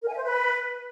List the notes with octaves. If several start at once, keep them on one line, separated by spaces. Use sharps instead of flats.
A#4
G#5
E5
C5
B4